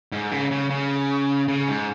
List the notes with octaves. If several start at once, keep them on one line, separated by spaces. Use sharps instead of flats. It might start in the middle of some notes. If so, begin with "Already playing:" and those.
G#2
C#3
C#3
C#3
C#3
G#2